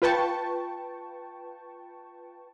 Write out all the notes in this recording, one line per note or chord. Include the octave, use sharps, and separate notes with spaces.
F4 B4 G5 A5 C#6